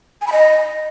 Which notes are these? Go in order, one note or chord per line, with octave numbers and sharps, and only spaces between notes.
G#5
B5
D#5